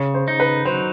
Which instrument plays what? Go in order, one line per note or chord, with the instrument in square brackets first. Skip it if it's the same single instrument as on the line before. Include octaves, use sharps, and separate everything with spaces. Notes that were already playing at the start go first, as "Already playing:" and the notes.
Already playing: [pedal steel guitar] C#3 [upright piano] C#5
[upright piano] C5
[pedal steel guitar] D#4
[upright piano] B4
[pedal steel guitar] F#3 [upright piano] C5